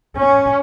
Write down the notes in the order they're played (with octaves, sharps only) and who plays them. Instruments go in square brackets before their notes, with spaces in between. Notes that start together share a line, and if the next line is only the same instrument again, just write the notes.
[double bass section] C#4